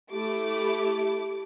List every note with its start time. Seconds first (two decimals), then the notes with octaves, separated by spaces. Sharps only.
0.11 A3 E4 G4 D6